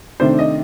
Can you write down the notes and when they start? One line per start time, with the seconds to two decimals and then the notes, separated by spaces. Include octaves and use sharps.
0.20 C3 D#3 A3 D4 C5
0.39 D#5